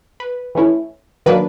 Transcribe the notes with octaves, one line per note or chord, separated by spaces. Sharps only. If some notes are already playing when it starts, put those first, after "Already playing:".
B4
E3 A3 C#4 E4
D#3 F#3 A#3 D4 B4